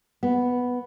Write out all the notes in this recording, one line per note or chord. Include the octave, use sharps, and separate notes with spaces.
B3